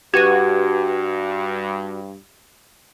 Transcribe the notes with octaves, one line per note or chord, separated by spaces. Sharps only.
G2 F#4 G4 B4 G#6 D#7